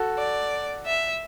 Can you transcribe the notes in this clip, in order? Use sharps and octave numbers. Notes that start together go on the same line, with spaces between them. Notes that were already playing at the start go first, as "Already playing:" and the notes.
Already playing: F#4 A4
D5
E5